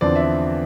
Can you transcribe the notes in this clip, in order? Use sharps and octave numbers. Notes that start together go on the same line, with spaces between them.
E2 D3 F3 C4 D5
E5
D5